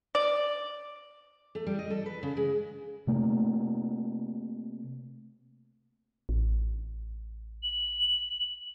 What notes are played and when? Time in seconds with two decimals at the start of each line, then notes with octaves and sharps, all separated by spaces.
0.15 D5
1.55 A3
1.66 G3
1.79 D#5
1.90 A4
2.06 B4
2.23 C#3
2.37 G#3
3.07 C3 A3 A#3
6.29 A1
7.63 F#7